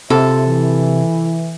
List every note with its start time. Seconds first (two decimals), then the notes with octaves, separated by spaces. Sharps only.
0.10 C3 F4 A4 C5 E5
0.46 E3